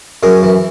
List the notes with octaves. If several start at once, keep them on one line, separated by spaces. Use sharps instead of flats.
F#2 G#4 A#4
E3